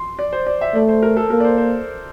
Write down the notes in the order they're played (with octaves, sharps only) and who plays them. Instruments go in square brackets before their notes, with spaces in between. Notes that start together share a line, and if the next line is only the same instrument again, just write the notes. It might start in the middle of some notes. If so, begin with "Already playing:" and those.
Already playing: [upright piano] C6
D5
C5
D5
E5
[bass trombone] A3 [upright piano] D5
[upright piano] C5
A#4
A4
[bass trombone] A#3 [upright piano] A#4
[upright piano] D5
C5
C5